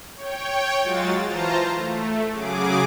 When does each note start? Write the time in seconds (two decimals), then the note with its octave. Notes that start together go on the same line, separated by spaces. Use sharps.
0.15 C#5 G5
0.81 F#3 G#3 F4 F#4 A6
1.27 E3 F4 C5 A5 A#5
1.75 A3
2.32 C#3 F#3 G#4 D6